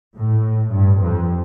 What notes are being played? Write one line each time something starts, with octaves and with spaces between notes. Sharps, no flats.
A2
G2
F2